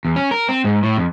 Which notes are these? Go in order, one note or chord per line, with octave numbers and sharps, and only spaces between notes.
E2
C#4
A#4
C4
G#2
A2
F2